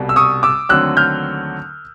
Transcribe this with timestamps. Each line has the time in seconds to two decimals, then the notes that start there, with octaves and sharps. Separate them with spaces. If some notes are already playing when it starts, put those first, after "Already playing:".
Already playing: C2 B2 G3
0.09 E6
0.16 C#6 D#6
0.43 D6 E6
0.69 D#2 D3 F#3 A3 C4 E6 F#6
0.97 F6 G6